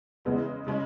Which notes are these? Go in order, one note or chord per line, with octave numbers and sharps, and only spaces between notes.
E2 C#3 E3 G#3 B3
C#3 G#3 C#4